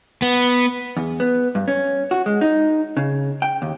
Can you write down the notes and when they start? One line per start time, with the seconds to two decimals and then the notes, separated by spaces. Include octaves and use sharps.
0.22 B3
0.97 E2
1.20 B3
1.55 G2
1.68 C#4
2.11 F#4
2.26 G#3
2.41 D#4
2.97 C#3
3.42 G5
3.62 D#2